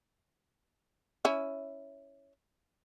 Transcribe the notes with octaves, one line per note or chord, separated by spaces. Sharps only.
C#4 E4